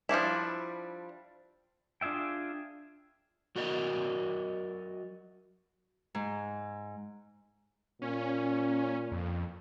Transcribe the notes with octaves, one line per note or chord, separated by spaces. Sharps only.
F3 G3 D4 E4
D4 F4 G#4 E5 G5
F#3 F#4 A#4 D5 D#5
G#2
A#2 C#4
F2